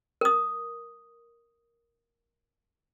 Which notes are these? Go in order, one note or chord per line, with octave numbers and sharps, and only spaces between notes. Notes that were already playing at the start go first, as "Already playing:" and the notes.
A#4 D#6